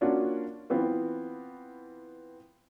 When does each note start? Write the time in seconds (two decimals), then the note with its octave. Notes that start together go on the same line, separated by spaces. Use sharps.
0.01 A#3 C#4 D4 F4 F#4
0.70 E3 B3 C4 F4